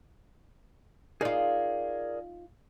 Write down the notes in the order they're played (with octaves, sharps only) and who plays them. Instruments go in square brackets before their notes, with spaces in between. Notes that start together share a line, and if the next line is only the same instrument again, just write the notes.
[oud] D#4 F4 [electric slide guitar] G#4 A#4 D5